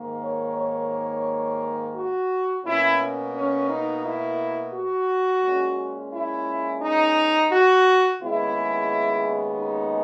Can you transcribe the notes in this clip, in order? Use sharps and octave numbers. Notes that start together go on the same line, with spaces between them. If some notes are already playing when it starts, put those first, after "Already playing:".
Already playing: G#2 D#3 A#3
C#5
C#5
F#4
B2 A#3 C#4 E4
C#4
D#4
E4
F#4
A#2 G#3 C#4
E4
D#4
F#4
D#2 C#3 G#3 B3 E4
D#4